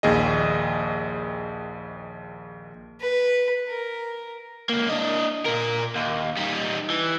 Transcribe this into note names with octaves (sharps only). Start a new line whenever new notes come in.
A#1 D#2 G#4 D#5
B4
A#4
C#2 A#3
D4 D#5
A#2 A#4
D#2
G3 D#4
E3